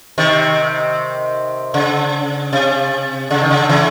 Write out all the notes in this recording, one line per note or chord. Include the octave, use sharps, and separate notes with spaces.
C3 D#3
C#3
C3
C#3
D#3
C#3
C#3 E3